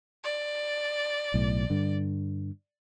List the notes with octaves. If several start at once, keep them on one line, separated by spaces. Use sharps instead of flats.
D5
B1 A2
G2 D3